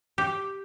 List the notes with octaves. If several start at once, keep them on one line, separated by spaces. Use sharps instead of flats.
G4